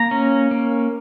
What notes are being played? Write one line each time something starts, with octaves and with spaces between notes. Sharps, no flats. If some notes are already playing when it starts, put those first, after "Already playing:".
Already playing: A#3 A#5
C#4
A#3